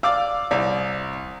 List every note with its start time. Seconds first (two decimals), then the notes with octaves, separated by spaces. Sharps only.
0.03 D5 F5 D6 E6
0.51 C2 D5